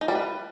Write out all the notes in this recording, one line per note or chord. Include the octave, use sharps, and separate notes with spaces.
D#4
G3
B4